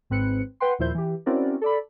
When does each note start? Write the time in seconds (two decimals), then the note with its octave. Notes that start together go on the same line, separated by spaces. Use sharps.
0.10 G#1 G#2 C4 B4 F#6 C#7
0.60 B4 F#5 G5 C6
0.79 D#2 A#2 F3 E4 C5 G6
0.95 E3 G4
1.26 C4 C#4 E4 F#4 A#4 D5
1.61 A4 D5 B5